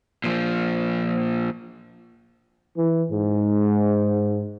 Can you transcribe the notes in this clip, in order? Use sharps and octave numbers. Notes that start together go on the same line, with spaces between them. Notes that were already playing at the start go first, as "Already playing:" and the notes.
A#2 F3
E3
G#2